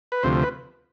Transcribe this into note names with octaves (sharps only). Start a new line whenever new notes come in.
B4
D2 C3 F3 C5
B4